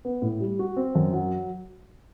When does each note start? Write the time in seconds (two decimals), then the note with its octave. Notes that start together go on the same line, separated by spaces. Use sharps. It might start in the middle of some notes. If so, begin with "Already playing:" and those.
0.05 B3
0.22 A2
0.40 G3
0.59 F#4
0.77 C4
0.95 F#2
1.13 F#3